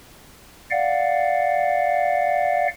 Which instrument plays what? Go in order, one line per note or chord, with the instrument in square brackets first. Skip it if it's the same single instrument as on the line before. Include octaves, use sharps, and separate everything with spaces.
[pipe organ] D5 F5 F#5